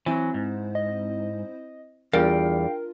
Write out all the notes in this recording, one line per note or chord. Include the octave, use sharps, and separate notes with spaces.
E3 F#3 C4 E4 C5
G#2
D#5
E2 G3 D4 F4 A#4 F5 G5